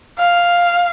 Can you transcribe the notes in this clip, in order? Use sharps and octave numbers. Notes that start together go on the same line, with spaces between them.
F5